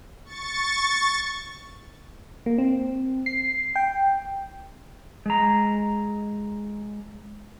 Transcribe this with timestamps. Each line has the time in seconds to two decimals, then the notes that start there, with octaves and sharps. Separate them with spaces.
0.25 C#6 A6
2.46 A#3
2.58 C4
3.26 C7
3.76 G5
5.26 G#3 A#5